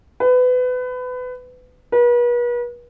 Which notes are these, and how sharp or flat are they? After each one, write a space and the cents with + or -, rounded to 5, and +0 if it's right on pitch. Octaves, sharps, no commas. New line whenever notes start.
B4 +25
B4 -40